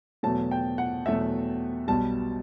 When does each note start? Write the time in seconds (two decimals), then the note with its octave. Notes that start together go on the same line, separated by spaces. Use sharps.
0.23 E2 B2 F#3 A3 A5
0.51 G5
0.78 F#5
1.06 E2 B2 F#3 A3 E5
1.88 B1 B2 G3 A5